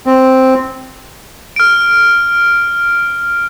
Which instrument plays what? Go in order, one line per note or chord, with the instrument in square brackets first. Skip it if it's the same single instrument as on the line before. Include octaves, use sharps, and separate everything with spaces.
[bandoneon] C4
[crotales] F6 D7